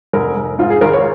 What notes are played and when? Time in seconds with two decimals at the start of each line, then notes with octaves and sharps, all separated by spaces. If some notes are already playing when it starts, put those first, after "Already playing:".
0.13 F1 A#4
0.36 F1
0.59 G#2 F4
0.70 G#4
0.81 G#1 A#4
0.93 C#5